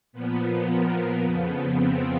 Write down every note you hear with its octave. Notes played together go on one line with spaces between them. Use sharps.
A#2 F3 B3
A#3
F2 C#3 F3 B3
C4